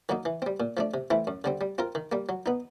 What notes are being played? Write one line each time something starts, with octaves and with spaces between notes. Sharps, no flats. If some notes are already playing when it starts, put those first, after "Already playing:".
D#3 F#3 A#3 D#4
E3
G3 C4
A#2
F3 A3 D4
C3
E3 A3 C4 E4
F#2
D3 G3 C4
G3
C4 F4 A#4
D#3
G3 A#3
F#3
B3 D#4